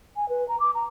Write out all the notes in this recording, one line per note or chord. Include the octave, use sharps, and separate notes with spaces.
G#5
B4
A#5
D6
A#5